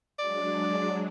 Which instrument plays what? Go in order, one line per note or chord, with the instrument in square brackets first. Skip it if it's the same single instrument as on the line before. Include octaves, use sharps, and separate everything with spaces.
[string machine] F#3 G#3 D4 [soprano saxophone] D5